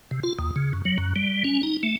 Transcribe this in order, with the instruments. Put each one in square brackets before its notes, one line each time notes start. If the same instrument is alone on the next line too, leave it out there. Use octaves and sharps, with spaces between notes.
[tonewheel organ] C3
F4
D#2
C#3
F#2
F#3
F#2
G3
C#4
D#4
A3